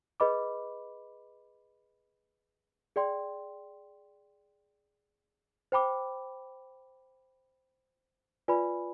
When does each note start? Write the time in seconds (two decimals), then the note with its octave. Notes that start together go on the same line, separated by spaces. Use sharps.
0.20 G#4 B4 D#5 B5 D6
2.96 G#4 D5 G5 C6
5.72 C5 G5 B5 D6
8.48 F4 B4 D5 G#5 B5